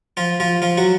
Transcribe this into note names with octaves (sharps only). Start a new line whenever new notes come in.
F3 F4
F3 F4
F3 F4
F#3 F#4